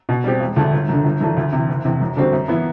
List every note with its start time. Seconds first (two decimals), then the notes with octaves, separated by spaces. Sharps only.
0.09 B2
0.24 G3 C4 G4
0.40 E1
0.56 D2 D3 A3 D4
0.72 G1
0.89 F#2 D3
1.05 G1
1.21 F#2 E3 A3 D4
1.37 D2
1.52 C3 E3
1.69 F#1
1.85 E2 C3
2.01 F#2
2.16 D3 G3 C4 F#4
2.33 F#2
2.48 E3 B3 E4